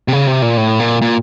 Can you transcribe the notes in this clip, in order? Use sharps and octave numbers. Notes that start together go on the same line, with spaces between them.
C3
C#3
C3
A#2
A2
A#2
A#2